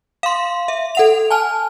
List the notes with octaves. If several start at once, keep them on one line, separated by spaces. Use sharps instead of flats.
F5 C6
E5
A4 F#5 F7
G#5 A5 F6